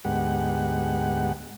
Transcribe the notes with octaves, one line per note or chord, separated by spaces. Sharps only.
D2 G#2 G#3 B3 G4 F#5